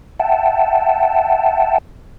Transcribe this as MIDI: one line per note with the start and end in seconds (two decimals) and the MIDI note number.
0.20 1.78 76
0.20 1.78 78
0.20 1.78 79
0.20 1.78 81